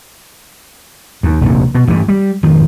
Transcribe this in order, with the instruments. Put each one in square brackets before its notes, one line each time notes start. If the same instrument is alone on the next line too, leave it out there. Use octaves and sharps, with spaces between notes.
[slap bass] D#2
F1 A#1 D#2
B2
A1 G2 E3
G3
G#1 F2 D#3 F3